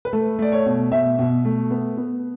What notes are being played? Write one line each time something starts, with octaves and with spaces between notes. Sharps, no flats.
B4
A3 A4
A3 D5
C#5
B2
B2 E5
B2
A3
B3
B3